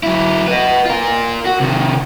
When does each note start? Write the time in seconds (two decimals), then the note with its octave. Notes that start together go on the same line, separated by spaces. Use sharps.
0.03 F#3 E4
0.47 B4 D#5
0.86 F4 A#4
1.46 F#4
1.60 C3 D#3